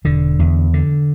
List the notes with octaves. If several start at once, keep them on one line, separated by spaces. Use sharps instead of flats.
E1 D3
E2
D3